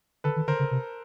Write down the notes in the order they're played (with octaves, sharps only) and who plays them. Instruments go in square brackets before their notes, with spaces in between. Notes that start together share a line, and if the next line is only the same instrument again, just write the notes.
[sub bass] D3 [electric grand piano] A4 B4
[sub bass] D#3
[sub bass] D3 [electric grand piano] A#4 C5
[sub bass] C#3
C3